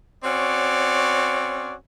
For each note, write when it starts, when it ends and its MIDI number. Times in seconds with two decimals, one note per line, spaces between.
0.23 1.74 60
0.23 1.74 61
0.23 1.74 66
0.23 1.74 73
0.23 1.74 74